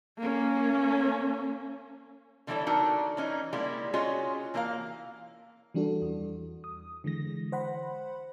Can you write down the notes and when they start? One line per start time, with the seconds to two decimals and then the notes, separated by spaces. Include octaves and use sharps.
0.18 A#3 C#4
2.47 D3 E3 G3 E4 A4 C#5
2.67 D4 D#4 F#4 A4 A#4
3.17 E3 C#4 D#4 E4
3.53 G3 G#3 A#3 E4 G4
3.93 C#4 F4 F#4 G#4 C#5 D#5
4.54 E3 A#3 D4 A#4 F5
5.74 E3 G3 D4 F#4 A4
6.02 E2
6.64 D#6
7.04 D3 E3 G#3 A#6
7.52 C5 F#5 B5